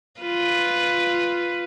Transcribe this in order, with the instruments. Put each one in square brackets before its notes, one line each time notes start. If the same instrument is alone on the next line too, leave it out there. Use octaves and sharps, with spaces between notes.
[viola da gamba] F4 B4